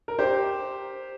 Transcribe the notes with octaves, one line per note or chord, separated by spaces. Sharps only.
A#4
G4 C5